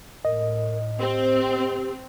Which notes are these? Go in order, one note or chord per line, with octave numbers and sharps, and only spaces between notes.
A2 A#4 D#5
C4 G4